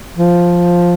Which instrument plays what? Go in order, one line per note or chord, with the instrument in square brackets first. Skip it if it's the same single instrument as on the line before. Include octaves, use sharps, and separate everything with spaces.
[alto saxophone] F3